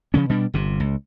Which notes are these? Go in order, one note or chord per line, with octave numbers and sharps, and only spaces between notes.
C#3 F3 C#4
B2 G3 D4
G1 C3
C#2